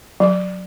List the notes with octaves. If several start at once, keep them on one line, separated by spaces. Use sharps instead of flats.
F#3